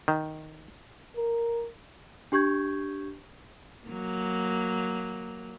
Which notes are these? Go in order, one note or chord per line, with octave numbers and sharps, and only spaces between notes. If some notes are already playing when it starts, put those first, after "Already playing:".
D#3
A#4
D4 G4 C#6 G6 G#6
F#3 A#3